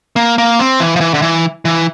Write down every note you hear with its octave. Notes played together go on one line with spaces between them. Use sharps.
A#3
A#3
C4
E3
F3
E3
D3
E3
E3